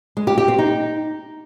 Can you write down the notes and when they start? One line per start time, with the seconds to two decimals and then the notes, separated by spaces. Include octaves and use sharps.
0.17 G#3
0.27 G4
0.38 G4
0.48 C4
0.58 D#4